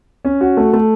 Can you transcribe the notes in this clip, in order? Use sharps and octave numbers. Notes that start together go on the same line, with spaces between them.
C#4
F#4
A3
A3